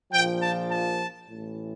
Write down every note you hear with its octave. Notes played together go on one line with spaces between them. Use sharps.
A#1 A#2 F3 G5
A5
A5
A1 A2 E3